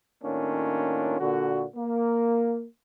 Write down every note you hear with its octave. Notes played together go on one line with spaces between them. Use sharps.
A2 D#3 A#3 C#4 D4 F4
A#2 D3 F#4
A#3